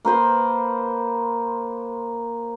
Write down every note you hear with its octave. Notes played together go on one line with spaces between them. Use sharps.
A#3 B4 C5 B5